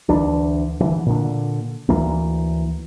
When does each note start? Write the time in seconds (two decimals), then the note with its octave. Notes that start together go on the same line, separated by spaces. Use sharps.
0.09 D2 E3 D4
0.80 D3 E3
1.06 A#2 D3
1.89 D2 E3 A#3